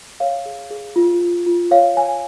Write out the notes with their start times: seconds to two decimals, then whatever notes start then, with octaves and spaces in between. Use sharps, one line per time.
0.20 C#5 F5
0.46 G#4
0.71 G#4
0.96 F4
1.21 F4
1.46 F4
1.71 C#5 F5
1.96 C#5 G#5